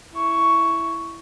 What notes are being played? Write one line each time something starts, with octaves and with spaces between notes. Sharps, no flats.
E4 C#6